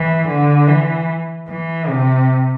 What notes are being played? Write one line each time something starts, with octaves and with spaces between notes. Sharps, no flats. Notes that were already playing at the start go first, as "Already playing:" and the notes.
Already playing: E3
D3
E3
E3
C3